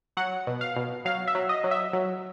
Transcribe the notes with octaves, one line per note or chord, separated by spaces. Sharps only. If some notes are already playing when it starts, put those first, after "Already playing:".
F#3 F#5
B2
F5
B2
F#3 F5
E5
F#3
D#5
F#3
E5
F#3